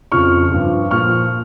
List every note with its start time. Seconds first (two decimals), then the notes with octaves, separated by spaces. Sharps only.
0.12 F2 C#3 F3 C#6 F6
0.52 G2 F3
0.91 A#2 F3 C#6 F6